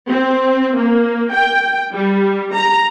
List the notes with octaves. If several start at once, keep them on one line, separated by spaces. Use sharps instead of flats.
C4
A#3
G5
G3
A#5